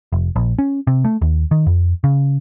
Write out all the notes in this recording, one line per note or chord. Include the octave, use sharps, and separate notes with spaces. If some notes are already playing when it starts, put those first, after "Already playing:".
F1
A#1
C#4
C3
A3
D#2
D#3
F2
C#3